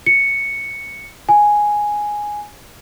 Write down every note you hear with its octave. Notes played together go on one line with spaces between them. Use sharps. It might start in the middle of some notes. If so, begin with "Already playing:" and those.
C#7
G#5